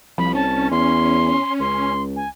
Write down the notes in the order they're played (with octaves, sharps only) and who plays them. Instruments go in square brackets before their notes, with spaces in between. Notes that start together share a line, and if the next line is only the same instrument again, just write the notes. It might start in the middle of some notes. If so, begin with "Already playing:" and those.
[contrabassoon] C2 [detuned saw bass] F3 [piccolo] B5
[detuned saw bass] C#4 [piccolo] A5
[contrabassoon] E2 [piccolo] C6
[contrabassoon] C#2 [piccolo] C6
[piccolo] G#5